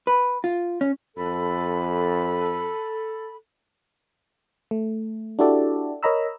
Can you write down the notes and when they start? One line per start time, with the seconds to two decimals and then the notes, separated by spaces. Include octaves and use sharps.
0.07 B4
0.44 F4
0.81 C#4
1.17 F2 A4 B5
4.71 A3
5.39 D4 E4 F#4 G4 A4 D5
6.03 A#4 C#5 D#5 A#5 B5 E6